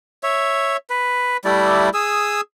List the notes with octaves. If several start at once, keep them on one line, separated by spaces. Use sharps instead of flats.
C#5 E5
B4
G3 A3 E4 D5
G#4 D#6 E6